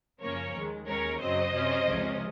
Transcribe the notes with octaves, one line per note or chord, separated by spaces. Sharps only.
F#2 C#3 F3 A#3 C#4 A#4 C#5
D#2 D#3 G#3
D#2 D#3 G#3 C#4 A#4 C#5
F#2 C#3 F#3 C4 C5 D#5
C3 F#3 C#4
C#2 C3 F3 G#3 C#4